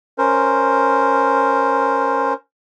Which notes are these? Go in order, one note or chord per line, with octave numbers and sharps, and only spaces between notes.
C#4 A#4 C5